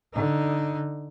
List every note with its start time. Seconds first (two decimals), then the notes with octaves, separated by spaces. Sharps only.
0.13 D3 D#4